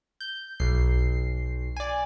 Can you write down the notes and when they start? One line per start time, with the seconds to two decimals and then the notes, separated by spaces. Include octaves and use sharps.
0.20 G6
0.60 B1 C7
1.77 D5 G#5